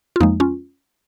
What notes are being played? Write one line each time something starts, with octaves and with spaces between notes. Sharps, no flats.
F4
F2 F3 G#3 A#3 D#4
C#4 F4